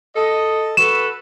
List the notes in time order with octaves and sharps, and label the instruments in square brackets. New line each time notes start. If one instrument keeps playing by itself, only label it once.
[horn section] A4 D#5
[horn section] F#4 A4 B4 [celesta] E7